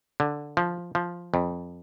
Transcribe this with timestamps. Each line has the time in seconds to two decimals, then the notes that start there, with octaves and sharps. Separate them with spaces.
0.20 D3
0.57 F3
0.95 F3
1.34 F2